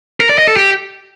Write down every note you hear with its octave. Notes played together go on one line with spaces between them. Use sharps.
A#4
D5
D#5
A4
G4